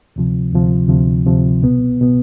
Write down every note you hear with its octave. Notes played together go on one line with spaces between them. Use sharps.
D2 C3 F3
D2 C3 F3
D2 C3 F3
D2 C3 F3
C2 B2 B3
B2 B3